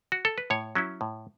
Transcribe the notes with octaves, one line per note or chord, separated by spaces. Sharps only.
F#4
A4
B4
A2 C#5
F#3 C#4 E4
A2